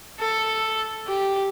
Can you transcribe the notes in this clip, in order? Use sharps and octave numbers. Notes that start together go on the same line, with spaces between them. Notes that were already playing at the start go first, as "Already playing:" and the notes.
A4
G4